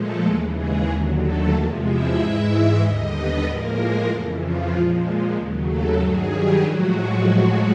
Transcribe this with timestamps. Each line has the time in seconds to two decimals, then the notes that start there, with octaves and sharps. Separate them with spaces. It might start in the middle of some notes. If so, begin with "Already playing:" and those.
Already playing: A#2 F3 G#3 A3 A4
0.24 D#2 C#3 E3 G#3 G#4
0.56 G#3 G#4
0.88 D#2 D3 F#3
1.20 A3 A4
1.52 E2 C3 F3 G#3 A#3 A#4
1.84 E4 E5
2.16 G#2 E3 G#3 E4 E5
2.80 D#2 D3 G3 D#4 D#5
3.12 B3 B4
3.44 A2 F3 G#3 A#3 A#4
4.07 F2 C#3 E3 A3 A4
4.40 F3 F4
4.71 A#2 F3 G#3
5.35 D#2 C#3 F#3
5.67 A3 A4
5.99 G2 D#3 F#3 G#3 G#4
6.31 G3 G4
6.62 A2 F3 F#3 G#3 F#4